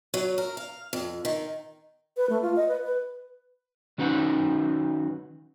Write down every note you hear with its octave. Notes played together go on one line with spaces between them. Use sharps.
F#3
A#4
F5
F2
D#3
B4
A3
F4
D#5
B4
B4
D#3 F#3 C#4 D#4 B4 F#5